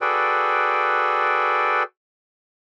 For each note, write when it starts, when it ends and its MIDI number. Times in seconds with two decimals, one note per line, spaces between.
0.01 1.83 66
0.01 1.83 68
0.01 1.83 69
0.01 1.83 71
0.01 1.83 74
0.01 1.83 79